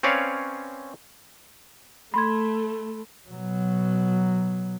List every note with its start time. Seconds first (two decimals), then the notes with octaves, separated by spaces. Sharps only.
0.03 C4 C#4 B4 C#5 D5 F5
2.14 A3 B5 C6 G#6
3.30 B2 F#3